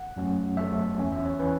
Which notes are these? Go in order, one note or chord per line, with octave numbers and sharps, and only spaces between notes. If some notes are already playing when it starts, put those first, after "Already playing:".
Already playing: F#5
F#2 F#3 A3 C#4
F#2 F#3 A3 C#4 E5
E2 E3 C#4
E5
C#5
E3 C#4 B4